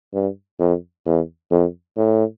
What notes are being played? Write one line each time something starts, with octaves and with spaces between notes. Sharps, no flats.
G2
F2
E2
F2
A2